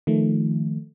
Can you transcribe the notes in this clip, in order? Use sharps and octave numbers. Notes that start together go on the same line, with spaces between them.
D#3 F3 A3